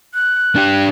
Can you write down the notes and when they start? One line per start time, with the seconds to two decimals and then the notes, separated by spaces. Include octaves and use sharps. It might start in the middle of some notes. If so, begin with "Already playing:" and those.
0.14 F#6
0.56 D4 G4